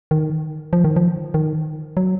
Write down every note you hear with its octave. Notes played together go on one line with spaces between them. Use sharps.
D#3
F3
D#3
F3
D#3
F#3